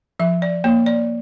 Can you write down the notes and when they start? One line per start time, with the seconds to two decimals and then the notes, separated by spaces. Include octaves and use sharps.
0.19 F3 E5
0.42 D5
0.64 A#3 C#5
0.86 D5